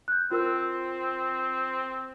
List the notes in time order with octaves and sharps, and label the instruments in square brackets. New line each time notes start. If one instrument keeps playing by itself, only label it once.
[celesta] F#6 G6
[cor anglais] C4 [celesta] F4 A#4 E6